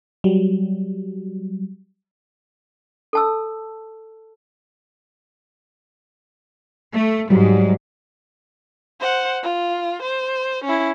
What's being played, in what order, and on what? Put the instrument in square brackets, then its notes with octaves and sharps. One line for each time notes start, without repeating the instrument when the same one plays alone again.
[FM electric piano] F#3 G3
[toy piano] A4 A5 E6
[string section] A3
[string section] G#2 [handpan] F#3 G3
[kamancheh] C5 F#5
F4
C5
C#4 E4